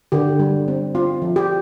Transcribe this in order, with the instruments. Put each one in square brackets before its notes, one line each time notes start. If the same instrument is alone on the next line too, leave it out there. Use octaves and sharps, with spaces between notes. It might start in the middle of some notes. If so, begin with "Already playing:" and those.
[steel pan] D3 G4
G3
C4
C4 F4
F3
G4